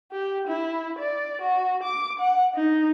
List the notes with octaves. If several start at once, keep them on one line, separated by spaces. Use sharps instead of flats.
G4
E4
D5
F#4
D6
F#5
D#4